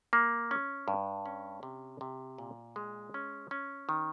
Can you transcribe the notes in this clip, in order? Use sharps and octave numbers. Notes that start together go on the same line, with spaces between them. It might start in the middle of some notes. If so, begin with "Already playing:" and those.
A#3
C#4
G2
C#4
C3
C3
A#2
G#3
C#4
C#4
D#3